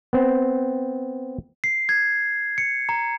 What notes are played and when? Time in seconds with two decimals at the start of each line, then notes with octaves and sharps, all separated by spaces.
0.13 B3 C4
1.64 C7
1.89 G#6
2.58 C#7
2.89 A#5